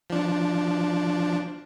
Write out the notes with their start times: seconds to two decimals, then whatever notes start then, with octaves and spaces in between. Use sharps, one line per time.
0.10 F3 D4